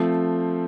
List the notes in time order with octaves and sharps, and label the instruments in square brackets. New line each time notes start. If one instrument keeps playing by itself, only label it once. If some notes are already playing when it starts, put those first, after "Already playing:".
Already playing: [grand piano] F3 A3 C4